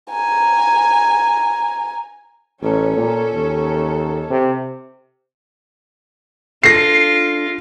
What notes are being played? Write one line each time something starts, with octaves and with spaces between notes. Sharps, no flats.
G#5 A#5
A1 C#4 A4
A#2
D#2
C3
D4 F4 A4 A5 A#6 C7